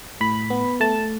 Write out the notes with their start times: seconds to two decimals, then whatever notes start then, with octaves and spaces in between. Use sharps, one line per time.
0.21 A2 B5
0.50 B3
0.80 A3 A5